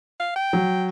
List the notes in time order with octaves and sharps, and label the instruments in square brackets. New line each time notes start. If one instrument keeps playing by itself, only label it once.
[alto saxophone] F5
G5
[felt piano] F#3